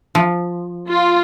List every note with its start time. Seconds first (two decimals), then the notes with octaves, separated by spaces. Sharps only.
0.15 F3
0.88 F4